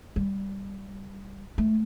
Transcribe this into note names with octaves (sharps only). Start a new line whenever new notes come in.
G3
A3